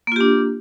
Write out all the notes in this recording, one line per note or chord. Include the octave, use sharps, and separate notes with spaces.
A#3 D4 F4 G4